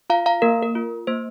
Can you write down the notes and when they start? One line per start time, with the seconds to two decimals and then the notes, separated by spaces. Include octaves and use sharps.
0.10 F4 F5 A#5
0.26 F5 A#5
0.42 A#3 A#4
0.62 A#4
0.75 F4
1.07 A#3 C5